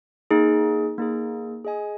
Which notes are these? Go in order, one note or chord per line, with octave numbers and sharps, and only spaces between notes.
A#3 D#4 G#4
A#3 D#4 G#4
G#4 D#5 G#5